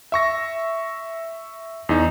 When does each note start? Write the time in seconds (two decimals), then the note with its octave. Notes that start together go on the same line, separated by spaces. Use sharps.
0.12 E5 C#6 A#6
1.89 E2 D#4